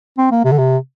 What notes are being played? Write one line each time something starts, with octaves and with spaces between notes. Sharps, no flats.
C4
A#3
C3
D3
C3